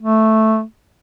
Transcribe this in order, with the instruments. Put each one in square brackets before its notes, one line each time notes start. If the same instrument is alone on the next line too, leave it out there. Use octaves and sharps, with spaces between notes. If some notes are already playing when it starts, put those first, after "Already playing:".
[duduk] A3